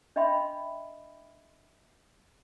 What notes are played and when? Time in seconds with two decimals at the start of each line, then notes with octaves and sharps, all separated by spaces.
0.16 D4 D#5 E5 G5 B5 C6